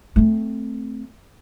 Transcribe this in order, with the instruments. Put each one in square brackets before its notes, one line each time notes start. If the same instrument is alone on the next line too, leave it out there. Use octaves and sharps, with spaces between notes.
[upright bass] A3 C4